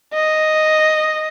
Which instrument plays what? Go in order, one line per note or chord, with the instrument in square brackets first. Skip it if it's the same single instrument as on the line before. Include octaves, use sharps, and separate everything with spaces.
[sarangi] D#5